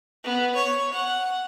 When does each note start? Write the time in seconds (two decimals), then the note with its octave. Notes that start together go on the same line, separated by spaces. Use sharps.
0.24 B3
0.55 C#5
0.93 F#5